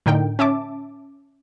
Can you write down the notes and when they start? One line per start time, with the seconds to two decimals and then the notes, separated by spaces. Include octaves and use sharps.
0.06 A2 D3 D#4 A#4 G5
0.39 C#4 E5 A5 D6